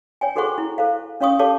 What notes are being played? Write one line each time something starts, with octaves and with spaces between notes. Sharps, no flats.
C#5 G5 G#5
F#4 G#4 A4 C5 F#5 C#6
E4
A4 C5 F5
C#4 C#5 F5 C#6 D#6
G4 A4 C#5 F5 A5 D6